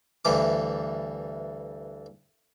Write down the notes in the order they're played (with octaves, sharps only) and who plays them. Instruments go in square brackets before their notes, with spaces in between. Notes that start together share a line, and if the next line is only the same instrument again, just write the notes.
[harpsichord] D2 G2 E3 D6